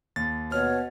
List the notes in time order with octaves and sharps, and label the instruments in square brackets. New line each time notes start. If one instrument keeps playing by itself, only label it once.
[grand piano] D#2 [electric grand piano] A6
[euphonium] B2 [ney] C#5 [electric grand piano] F6